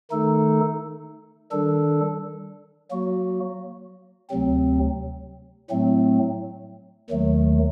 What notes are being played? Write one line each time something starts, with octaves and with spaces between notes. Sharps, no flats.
D#3 A3 D#4 A4
D#3 G3 D4 A4
F#3 A#3 F#4
D2 C3 F#3 C4
A2 F#3 A3 C4
D#2 D#3 F#3 A3